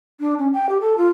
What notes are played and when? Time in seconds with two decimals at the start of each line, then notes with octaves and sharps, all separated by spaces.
0.20 D4
0.39 C#4
0.54 G5
0.69 G4
0.81 A4
0.98 F4